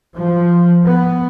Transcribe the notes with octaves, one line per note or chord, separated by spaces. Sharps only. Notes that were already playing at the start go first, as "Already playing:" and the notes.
F3
B3